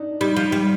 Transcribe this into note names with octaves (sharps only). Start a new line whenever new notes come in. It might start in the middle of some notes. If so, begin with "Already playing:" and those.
Already playing: D4 D#4
G3 D#4
F3
G3